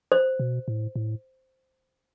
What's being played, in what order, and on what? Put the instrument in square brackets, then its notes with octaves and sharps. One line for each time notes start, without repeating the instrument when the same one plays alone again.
[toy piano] C5
[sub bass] B2
A2
A2